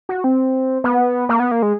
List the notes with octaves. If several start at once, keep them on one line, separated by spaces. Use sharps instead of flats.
F#4
C4
B3
A#3
B3
A#3
G#3